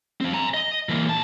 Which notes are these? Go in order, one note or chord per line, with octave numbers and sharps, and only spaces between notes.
F3 C4
G#5 A#5
D#5
E3 A#3
A#2 A5